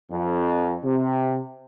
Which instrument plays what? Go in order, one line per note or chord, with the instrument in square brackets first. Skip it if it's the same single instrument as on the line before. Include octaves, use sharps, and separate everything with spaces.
[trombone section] F2
C3